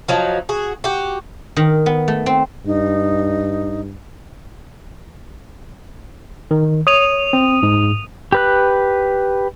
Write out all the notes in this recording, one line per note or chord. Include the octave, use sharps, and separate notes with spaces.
F3 F#3 D#4
F#4 G#4
F#4 G4
D#3
B3
A3
C4
G2 D#4
D#3
C#5 D#6 D#7 F7
C4
G#2
G4 B4 F#6